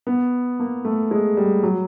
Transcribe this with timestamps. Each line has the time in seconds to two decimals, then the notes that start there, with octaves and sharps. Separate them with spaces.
0.07 B3
0.59 A#3
0.85 A3
1.11 G#3
1.37 G3
1.63 F#3